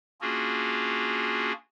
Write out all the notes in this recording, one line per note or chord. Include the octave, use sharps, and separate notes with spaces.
A#3 C#4 D4 F4 F#4 G#4